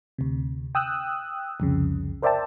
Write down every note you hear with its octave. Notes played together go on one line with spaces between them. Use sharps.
D2 C3
G5 D#6 E6 F#6
C2 F2 C#3
A#4 C5 D5 E5 G5 A5